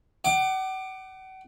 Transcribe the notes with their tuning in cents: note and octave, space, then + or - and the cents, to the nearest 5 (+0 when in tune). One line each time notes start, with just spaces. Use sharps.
F#5 +40 D6 +25